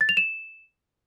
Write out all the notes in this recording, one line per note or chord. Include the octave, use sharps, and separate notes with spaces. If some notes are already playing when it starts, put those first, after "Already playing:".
A6
F7
E7